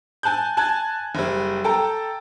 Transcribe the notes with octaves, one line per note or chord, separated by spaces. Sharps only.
G#5 A5 F#6 G6
G#5 A5 F#6 G#6
F#1 G3
A4 G5 A5 A#5